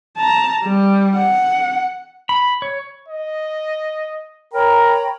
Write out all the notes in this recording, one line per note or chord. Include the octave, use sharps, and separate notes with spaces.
A5 A#5
G3
F#5
B5
C#5
D#5
A#4 C#5 G5 A#5 B5